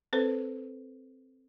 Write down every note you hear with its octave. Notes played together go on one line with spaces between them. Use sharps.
C4 A4 B4 C5